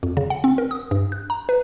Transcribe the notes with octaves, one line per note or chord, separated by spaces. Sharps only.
F2
C#3
F#5
C4
A#4
D#6
G2
F#6
A#5
B4